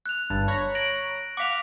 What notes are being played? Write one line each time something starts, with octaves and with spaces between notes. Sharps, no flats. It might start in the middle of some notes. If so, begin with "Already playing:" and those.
F#6 F7
G1 G2 A5
C#5 A#5 B5
A#6 D7 F#7
F5 F#5 D6 B6 F7